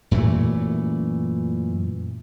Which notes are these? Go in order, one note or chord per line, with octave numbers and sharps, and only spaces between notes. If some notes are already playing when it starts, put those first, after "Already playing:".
F#2 A#2 E3 A3